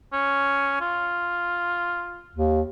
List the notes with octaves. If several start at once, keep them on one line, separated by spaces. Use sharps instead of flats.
C#4
F4
D#2